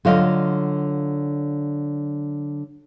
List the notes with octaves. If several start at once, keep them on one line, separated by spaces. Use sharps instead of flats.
D3 F#3 F4 D#5 F5